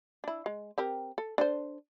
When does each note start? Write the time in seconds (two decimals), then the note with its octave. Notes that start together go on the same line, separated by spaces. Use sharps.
0.24 D4 E4
0.46 G#3
0.78 C4 G4 A#4
1.18 A4
1.38 D4 A4 C5